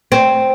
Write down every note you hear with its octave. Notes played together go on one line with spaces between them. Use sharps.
C4